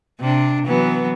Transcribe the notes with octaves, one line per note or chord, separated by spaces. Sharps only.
C3 D4
E3 F#3 B3